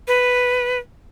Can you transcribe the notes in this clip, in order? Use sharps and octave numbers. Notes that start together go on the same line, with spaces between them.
B4